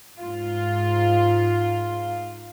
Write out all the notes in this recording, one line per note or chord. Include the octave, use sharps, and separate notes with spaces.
G#2 F4